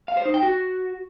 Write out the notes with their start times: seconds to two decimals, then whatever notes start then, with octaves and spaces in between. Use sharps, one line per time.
0.08 F5
0.17 C5
0.25 D#4
0.34 G5
0.43 F#4